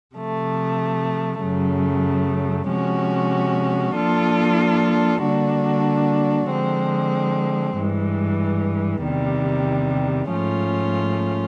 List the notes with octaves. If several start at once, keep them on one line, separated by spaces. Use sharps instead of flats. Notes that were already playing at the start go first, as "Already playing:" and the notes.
C3 F3 A3
F#2 C#3 F#3 A3
C3 F3 G#3 C#4 F#4
F3 A#3 D4 F4 A4
D3 G3 A#3 D4 F#4
D3 F3 G#3 C4
G2 E3 G#3
E2 C3 D#3 G3
G#2 F3 A3 C#4 F4